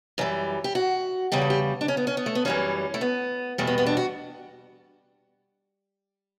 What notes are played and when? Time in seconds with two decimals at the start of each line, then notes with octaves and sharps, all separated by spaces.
0.18 F#2 E3 G3
0.64 G4
0.75 F#4
1.32 E2 C#3 G3 G4
1.42 A4
1.50 G4
1.81 D4
1.88 C#4
1.97 B3
2.07 C#4
2.17 B3
2.26 A3
2.35 B3
2.45 F#2 E3 G3 C#4
2.94 A3
3.01 B3
3.58 E2 B2 G3 A3
3.67 B3
3.78 B3
3.86 D4
3.97 F#4